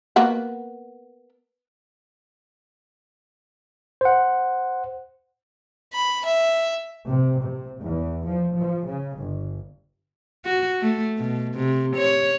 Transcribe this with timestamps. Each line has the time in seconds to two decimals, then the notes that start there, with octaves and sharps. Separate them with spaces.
0.16 A#3 B3 F#4
4.01 C5 F#5
5.92 B5
6.24 E5
7.06 C3
7.41 C3
7.80 E2
8.26 F3
8.57 F3
8.87 C#3
9.18 G1
10.45 F#4
10.82 A3
11.17 B2
11.55 C3
11.97 C#5